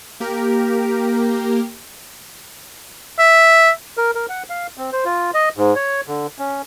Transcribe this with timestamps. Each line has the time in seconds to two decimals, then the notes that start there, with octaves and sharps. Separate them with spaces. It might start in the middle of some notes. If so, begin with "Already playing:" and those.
0.20 A#3 G4 A#4
3.19 E5
3.97 A#4
4.15 A#4
4.29 F#5
4.50 F5
4.77 C4
4.93 C5
5.05 F4
5.34 D#5
5.57 G#2
5.76 C#5
6.07 D3
6.39 C#4